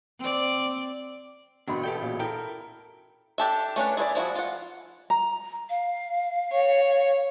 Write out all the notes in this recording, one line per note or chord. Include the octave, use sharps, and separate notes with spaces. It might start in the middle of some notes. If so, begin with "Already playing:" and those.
C4 D5
A1 B2 D#3 D4 B5
E2 G4 A4 G5
C#2 A#2
E4 A4 A#4 G5
D4 G4 A4 E5
A3 C#4 D4 B4
E4 G#4 C5 D5
F3 E4 F#4
F4 F#5
A#5
F5
C#5